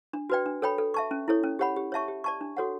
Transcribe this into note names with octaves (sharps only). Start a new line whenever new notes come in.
D4
F#4 B4 D5 G5
D4
A4 C#5 G5 B5
A4
E5 A5 C#6
C#4
E4 A4 C#5
C#4
G4 C#5 F#5 B5
G4
C#5 E5 A5 C#6
G4
D5 A5 C#6
D4
F#4 A4 C#5 F#5